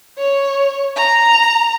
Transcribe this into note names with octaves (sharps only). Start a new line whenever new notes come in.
C#5
A#5